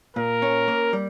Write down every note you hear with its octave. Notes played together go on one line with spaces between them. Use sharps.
A#2 A#4
C#4
A#3
G3